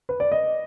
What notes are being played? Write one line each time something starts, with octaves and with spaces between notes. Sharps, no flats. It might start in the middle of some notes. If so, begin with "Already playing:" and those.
B4
D5
D#5